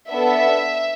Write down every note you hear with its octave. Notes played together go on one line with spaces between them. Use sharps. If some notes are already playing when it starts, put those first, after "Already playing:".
B3 D4 A4 E5